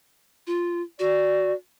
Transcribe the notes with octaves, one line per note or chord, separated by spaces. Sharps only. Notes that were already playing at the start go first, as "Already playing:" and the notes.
F4
F#4 D5